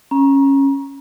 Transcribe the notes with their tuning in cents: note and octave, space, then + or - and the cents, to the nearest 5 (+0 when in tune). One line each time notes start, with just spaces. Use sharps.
C#4 -15 A#5 +25